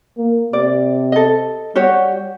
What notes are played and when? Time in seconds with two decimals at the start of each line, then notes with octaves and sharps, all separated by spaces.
0.18 A#3
0.53 C3 D5
1.12 A4 D#5
1.75 G3 F#4 G4 C#5